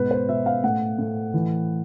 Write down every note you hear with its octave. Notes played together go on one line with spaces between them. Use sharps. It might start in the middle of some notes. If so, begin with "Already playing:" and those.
Already playing: G#2 B2 B4
C5
B2 E5
F5
A2 F#5
A2
E3